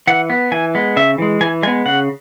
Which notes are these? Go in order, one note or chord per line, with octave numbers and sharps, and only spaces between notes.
E3 F#5
B3
E3 G#5
G#3 B3
C#3 E5
E3 G#3
E3 G#5
G#3 B3 G#5
C#3 F#5